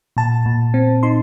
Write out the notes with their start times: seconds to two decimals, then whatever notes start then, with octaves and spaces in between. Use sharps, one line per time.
0.17 A#2 A5
0.46 A#2
0.74 C4
1.03 D#4 C6